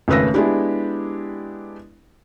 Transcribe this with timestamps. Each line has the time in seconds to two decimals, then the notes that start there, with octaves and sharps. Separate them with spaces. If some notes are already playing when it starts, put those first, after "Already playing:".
0.08 G#1 C#3 A3 B4 E6 A#6
0.34 G#3 B3 D4 E4 G4